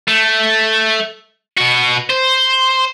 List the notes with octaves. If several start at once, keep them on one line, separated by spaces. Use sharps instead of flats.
A3
B2 F#4
C5